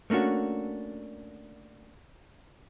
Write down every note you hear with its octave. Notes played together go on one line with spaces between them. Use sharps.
A3 A#3 C#4 D4 F#4